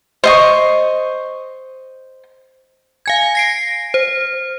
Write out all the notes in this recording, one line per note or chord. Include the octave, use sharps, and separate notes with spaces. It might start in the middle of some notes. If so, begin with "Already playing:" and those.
C5 D#5 C#6
F5 G#5 G#6
A#6 C7 D7
C5